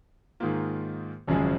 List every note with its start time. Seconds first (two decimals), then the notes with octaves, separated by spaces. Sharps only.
0.40 G#2 D#3 A#3 F4
1.28 G#1 F#2 C#3 F3 G#3